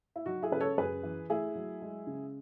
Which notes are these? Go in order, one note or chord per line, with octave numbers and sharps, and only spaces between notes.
E4
F#3 D#4 F#4
E4 G#4
C#3 B4
A4 C#5
F#2 G#4 B4
E3
A3 E4 G#4
F#3
G#3
C#3